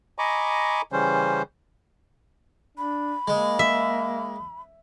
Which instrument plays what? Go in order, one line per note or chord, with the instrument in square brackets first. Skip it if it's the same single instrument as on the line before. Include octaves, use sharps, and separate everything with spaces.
[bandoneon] D#5 G#5 A#5 B5 C#6 D6
C#3 E3 G3 C#4 C5
[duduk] D4 [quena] B5
[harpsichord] G#3 [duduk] A#3
[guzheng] E5